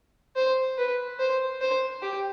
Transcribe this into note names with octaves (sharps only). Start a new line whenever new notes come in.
C5
B4
C5
C5
G4